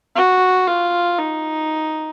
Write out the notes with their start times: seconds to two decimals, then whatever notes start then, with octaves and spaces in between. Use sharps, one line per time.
0.15 F#4
0.67 F4
1.19 D#4